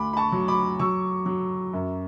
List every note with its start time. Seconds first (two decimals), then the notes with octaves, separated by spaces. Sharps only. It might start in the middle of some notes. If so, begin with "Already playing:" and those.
Already playing: D2 B5 D6
0.13 B5
0.17 A5 C#6
0.32 F#3
0.48 B5 D6
0.79 F#3 C#6 E6
1.26 F#3
1.73 F#2